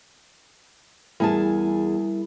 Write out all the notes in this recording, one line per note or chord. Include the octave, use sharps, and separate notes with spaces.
E2 G3 E4 G#4 A#4 A5